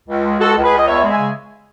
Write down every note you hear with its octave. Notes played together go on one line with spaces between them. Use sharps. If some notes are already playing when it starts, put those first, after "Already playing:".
C#2
G#3
C#2 F#4 A4
C#2
G#4 B4
C#2
D#5
E2 C#5 E5
G#3
E5 G#5
C#3